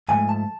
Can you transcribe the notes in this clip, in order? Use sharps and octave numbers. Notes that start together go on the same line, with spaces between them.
G#2 F3 A3 G#5
A5